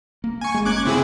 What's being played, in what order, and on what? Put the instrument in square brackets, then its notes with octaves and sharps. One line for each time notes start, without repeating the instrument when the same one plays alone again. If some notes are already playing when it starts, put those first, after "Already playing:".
[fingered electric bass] A#3
[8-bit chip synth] G#5 C#6
[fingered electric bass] G#3 A#3
[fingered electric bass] F#1 A#3 C#4 [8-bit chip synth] D6 F#6 G#6
[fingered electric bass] C#3 B3 [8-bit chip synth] C4 E4 G#4